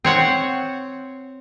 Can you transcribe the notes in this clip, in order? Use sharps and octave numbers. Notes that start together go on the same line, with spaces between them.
C4 C#5 F#5